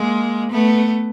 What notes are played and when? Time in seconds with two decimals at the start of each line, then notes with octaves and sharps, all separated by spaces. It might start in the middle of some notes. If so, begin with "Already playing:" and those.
Already playing: G#3 A#3
0.51 A3 B3